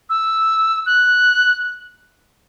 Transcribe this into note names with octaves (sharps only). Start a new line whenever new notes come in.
E6
F#6